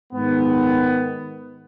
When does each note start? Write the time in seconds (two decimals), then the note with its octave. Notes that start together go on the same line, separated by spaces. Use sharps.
0.13 G#2 D#3 B3